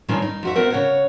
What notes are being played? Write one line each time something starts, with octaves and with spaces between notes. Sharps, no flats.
G2 A#2 D#3 C4 C#4 F4
D#4
F2 F#4 E5
B3 C4 A#4 C5 E5 F#5
C#3 C#5 F#5